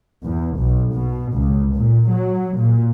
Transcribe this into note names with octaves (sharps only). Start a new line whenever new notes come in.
E2
B1
B2
C#2
A#2
F#3
A#2